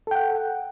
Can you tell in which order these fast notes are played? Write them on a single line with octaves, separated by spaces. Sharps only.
A4 G5 F#5